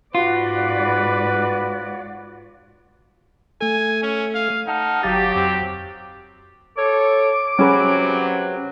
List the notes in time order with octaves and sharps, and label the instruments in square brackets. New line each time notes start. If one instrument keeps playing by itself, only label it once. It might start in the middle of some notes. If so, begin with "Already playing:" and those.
[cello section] G#2 D5 [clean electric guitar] F4 [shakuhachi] F#4 [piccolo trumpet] B4
[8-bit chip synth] A3 A4 [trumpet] G#5
[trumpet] C#4
F5
[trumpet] D#4 [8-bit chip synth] F#5 A5 F6
[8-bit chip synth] G1 F5 A6 [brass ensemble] F#3 G4
[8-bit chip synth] F2 [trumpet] C4
[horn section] A4 C#5 [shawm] D6
[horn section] C3 F#3 [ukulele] C#4 G#4 B4